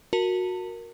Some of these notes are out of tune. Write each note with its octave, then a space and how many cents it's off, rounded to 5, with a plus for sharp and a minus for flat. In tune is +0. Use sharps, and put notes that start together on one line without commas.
F#4 -15 A#4 +0 A5 +40